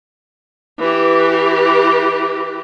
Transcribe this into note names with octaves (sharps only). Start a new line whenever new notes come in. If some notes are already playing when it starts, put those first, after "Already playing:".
E3 G4